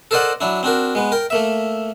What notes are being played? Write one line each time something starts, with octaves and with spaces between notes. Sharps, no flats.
A4 A#4 C5 D5 D#5 F#5
F#3 D4 E4
C4 D4 F#4 A#4
G#3 B3
A#4 G5
A3 A#3 E5